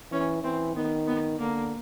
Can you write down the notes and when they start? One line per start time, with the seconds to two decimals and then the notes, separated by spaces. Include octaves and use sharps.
0.12 E3 C#4
0.43 E3 C4
0.76 D#3 B3
1.07 B3
1.39 D3 A#3